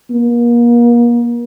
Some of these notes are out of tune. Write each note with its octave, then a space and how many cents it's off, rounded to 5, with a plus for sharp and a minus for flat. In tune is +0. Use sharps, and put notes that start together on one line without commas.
A#3 +35